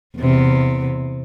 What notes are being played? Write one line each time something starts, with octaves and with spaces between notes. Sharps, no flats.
E2 C3